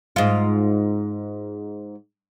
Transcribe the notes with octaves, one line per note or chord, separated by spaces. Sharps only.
G#2 F4